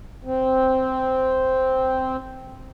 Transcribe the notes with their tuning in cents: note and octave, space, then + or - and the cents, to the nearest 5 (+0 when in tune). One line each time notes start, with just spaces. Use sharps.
C4 -5